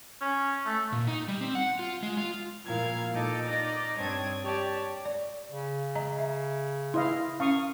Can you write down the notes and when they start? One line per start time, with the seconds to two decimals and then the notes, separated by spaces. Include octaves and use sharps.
0.21 C#4
0.66 A3
0.92 A#2
1.07 D#4
1.28 G3
1.41 C4
1.55 F#5
1.79 F4
2.03 G#3
2.17 F4
2.66 A#2 F3 A#3 E4 F5 G#6
3.12 A#2 D#4 A4 D6
3.46 D#4 D5 D6 F6 A#6
3.96 G2 C4 D4 C#5 D#6 G#6
4.43 G4 C#5 D5 A5
5.05 D5
5.50 C#3
5.95 D#5 A#5
6.19 E5
6.94 E4 D#5 F5 C6
7.40 C#4 F5 C#6 D#6